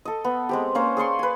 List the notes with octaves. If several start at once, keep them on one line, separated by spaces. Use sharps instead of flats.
A4 D#5
B3
G#3 C4 G4
A#3 C#4 C5
G#4 D5 C6 C#6
B4 G#5